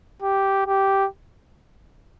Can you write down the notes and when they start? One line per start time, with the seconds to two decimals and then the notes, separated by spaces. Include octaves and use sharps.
0.22 G4
0.67 G4